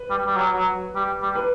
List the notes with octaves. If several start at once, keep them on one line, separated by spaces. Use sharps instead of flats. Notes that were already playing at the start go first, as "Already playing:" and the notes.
Already playing: B4
G3
G3
F#3
F#3
G3
G3
B4